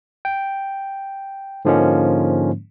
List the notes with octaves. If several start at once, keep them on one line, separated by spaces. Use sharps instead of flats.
G5
G#2 D3 F3 G#3 A#3 C#4